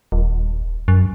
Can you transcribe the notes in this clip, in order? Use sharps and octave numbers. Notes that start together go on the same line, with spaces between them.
D#1
F#2